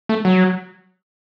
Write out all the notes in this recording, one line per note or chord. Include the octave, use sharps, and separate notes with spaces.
A3
F#3